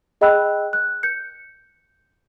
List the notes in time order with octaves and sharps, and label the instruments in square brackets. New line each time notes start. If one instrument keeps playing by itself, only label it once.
[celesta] G#4 D#5 G5 B5 E6 F#6
F#6
G6 C#7